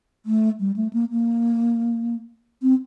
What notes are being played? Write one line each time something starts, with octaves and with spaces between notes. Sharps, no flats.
A3
G3
A3
A#3
A#3
C4